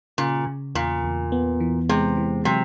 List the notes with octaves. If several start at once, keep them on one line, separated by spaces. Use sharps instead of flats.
A#2 C#3
C#3
E2 A#2
E2
B3
E3
C3 G#3
E3
C3 F#3